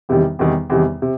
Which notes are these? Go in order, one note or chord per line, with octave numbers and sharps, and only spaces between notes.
E2 C3 D#3 G3
E2 C3 D#3 G3
E2 C3 D#3 G3
C3